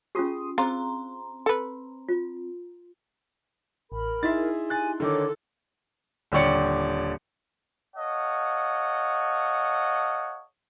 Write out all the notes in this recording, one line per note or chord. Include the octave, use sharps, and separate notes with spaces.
C#4 F4 G4 G#4 C6 D#6
C4 F4 G#4 A#5 C6
A4 B4
F4
A1 A#4 B5
D#4 E4 G#4 E5 C6 A6
G4 G#5 F#6 A6
D3 D#3 A4 C#5 D6
D#1 D3 G4 C#5 D5 C#7
A4 C#5 D#5 F5 F#5